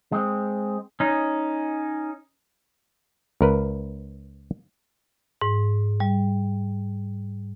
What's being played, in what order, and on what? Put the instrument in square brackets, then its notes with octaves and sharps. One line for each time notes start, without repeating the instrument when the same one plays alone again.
[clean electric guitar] G#3 C4
[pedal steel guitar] C#4 D#4
[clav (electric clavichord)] C#2 A#4 B4
[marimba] G#2
G3